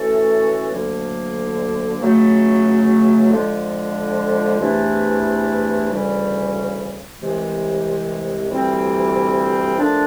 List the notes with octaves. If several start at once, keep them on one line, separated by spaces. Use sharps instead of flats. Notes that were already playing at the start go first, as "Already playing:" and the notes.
Already playing: E3 A3 C#4 F#4 A4
D2 D3 F#3 A#3
C#2 C#3 F#3 A3
F2 D3 F3 G#3
E2 C3 E3 A3 D4
D2 C#3 E3 G3
C2 C3 E3 G#3
D2 C3 E3 G3 C4
A#2 F3 A3 D4